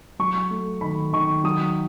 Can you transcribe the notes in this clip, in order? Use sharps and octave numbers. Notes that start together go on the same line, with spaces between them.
F#3 C#6
A3
D#3 B5
D#3 C#6
F#3 D#6